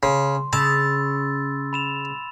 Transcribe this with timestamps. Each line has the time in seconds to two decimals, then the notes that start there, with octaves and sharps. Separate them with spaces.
0.03 C#3 C6
0.53 C#3 A5 B5 E6 A6
1.73 B5 E7 F7